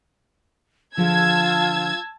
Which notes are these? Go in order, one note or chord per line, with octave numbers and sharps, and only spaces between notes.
D3 F3 F4 G#4 A5 E6 G#6